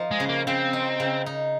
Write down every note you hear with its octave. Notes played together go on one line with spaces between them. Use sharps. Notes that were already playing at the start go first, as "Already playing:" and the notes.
Already playing: F3 D#4
G#3
C#3
A#3
C#3 C4
D#4
C#3
D#4